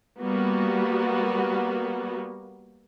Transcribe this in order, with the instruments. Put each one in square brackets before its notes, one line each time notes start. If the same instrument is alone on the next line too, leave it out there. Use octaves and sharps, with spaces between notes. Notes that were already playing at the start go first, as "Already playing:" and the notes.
[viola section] G3 A#3 B3 F#4